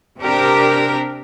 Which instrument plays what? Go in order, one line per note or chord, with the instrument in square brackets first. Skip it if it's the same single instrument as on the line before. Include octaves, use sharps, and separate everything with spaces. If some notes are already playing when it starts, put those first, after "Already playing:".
[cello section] C3 D4 G4 A#4